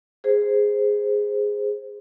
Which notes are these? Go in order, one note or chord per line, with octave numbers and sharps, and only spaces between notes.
G#4 C5